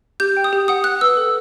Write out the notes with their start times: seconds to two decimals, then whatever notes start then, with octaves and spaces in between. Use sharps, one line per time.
0.20 G4 G6
0.37 G5
0.44 D#6
0.53 G4
0.68 F#5 D#6
0.84 F#5 F#6
1.01 B4 E6
1.17 A4